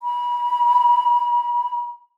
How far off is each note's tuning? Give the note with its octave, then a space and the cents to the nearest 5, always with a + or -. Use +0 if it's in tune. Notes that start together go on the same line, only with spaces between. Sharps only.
B5 -30